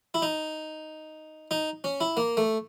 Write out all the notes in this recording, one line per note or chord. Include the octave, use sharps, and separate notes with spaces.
E4
D#4
D#4
C#4
E4
A#3
A3